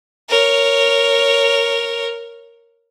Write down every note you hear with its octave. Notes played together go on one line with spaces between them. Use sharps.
A#4 C#5